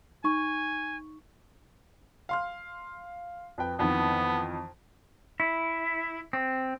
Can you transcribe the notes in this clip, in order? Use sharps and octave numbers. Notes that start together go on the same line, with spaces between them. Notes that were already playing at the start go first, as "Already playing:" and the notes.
D#4 G#5 C#6
F5 C6 F6
F2 B4 G5
F2 D#3 E3 B3
E4
C4